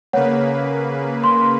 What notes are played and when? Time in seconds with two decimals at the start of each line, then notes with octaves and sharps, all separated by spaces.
0.13 C#3 A#3 B4 C#5 F#5
1.24 C6